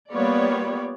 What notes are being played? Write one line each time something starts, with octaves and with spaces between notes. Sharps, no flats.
G3 A#3 B3 F4 C#5 D5